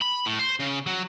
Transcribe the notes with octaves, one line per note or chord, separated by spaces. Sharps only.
B5
A2
C5
C#3
F#3